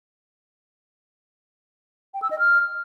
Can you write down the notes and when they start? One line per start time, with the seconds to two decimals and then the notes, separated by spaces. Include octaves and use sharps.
2.14 G5
2.22 E6
2.31 D#5
2.39 F6